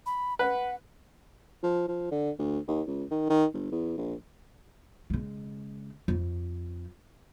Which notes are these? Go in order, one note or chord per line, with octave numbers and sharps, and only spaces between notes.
B5
B4 F#5
F3
F3
D3
D2
D#2
C#2
D#3
D#3
G1
E2
A#1
C#3 G#3
F2